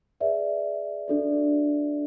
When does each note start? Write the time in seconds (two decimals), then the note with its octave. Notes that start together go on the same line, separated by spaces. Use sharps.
0.20 G#4 B4 D5 E5
1.08 D4 F#4 A4 D5